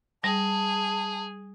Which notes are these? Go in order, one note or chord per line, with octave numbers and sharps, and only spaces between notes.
G3 G#4 A5